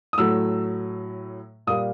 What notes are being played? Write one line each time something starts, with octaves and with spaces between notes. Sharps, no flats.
D#6
A2 F#3 A3 E6
A#2 G3 A#3 D#6